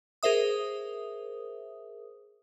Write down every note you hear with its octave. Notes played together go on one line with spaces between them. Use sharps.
G#4 A#4 C5 E5 D#6